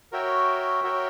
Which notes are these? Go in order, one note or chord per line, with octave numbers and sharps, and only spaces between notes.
F#4 A#4 C#5 E5 G5
F#4 A#4 C#5 E5 G5